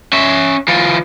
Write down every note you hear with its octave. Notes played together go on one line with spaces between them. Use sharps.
C#4 E5
E3 F4